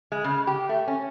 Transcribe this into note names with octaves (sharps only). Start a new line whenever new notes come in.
G#3
C#3
G4
A3
C#4